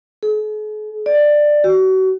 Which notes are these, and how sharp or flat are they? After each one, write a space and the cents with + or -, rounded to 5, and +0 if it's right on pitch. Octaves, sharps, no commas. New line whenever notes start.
G#4 +45
D5 +15
F#4 +35